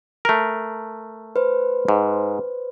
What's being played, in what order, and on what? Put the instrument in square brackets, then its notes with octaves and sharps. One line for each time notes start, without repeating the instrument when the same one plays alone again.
[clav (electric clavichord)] A3 A#4
[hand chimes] B4 C5
[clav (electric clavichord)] G#2